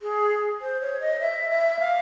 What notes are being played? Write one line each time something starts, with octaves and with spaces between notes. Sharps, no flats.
G#4
C5
C#5
D#5
E5
E5
F5